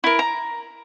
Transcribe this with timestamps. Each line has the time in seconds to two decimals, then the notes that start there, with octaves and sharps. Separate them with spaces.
0.04 E4 A#4
0.19 A#5